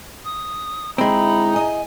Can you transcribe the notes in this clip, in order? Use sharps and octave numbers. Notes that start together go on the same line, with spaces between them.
D#6
D3 G#3 C4 D#4 E4 B5
G#4 D#5 G#5